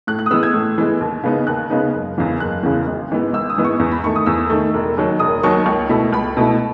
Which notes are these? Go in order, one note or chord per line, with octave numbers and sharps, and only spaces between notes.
A2 F#6
F#6
D#6
E3 G#3 B3 E6
G#6
A2
E3 G#3 B3
D#2
C#3 G#3 B3 D#4
D#2 F#6
C#3 G#3 B3 D#4
F#1
E2 C#3 E3
F#1 F#6
E2 C#3 E3
G#1
G#2 E3 B3
G#1 E6
D#6
G#2 E3 B3
C#6
E2
B5
D#3 A3 C#6
D#6
E2 E6
D#3 A3
E1
D#2 D#3 F#3
E1 D#6
D#2 D#3 F#3 C#6
C#2
B2 A3 E4
C#2 B5
B2 A3 E4